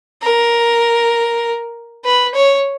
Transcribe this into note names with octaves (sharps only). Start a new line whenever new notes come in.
A#4
B4
C#5